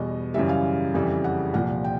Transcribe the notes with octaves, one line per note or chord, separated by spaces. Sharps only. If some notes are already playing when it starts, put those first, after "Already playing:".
Already playing: E2 B2 G3 D#5
F#2 C#3 E3 G3 E5
F5
F2 C#3 E3 G3
F#5
C2 A#2 F3 F#5
G5